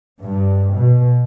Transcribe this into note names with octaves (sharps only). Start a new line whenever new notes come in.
G2
B2